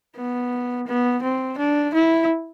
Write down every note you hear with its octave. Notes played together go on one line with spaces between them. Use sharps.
B3
B3
C4
D4
E4